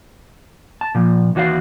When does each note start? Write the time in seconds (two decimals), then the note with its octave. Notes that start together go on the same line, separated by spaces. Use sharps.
0.81 A5
0.95 A#2 F3
1.35 D#2 E3 F#4 C#5 F5